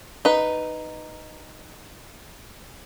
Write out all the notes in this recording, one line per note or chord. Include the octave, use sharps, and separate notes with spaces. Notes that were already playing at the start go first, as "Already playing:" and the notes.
D#4 B4